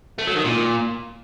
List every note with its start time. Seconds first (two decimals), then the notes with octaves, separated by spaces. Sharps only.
0.19 A3
0.27 F#3
0.36 D#3
0.45 A#2